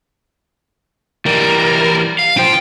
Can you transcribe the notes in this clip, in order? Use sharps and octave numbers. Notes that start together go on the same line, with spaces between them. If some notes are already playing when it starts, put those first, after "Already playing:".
E3 G3 A#4
F5
F4 C5 G5